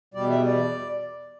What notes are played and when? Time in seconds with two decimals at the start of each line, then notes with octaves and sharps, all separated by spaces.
0.14 E2 B2 G3 D5
0.30 E5
0.45 D5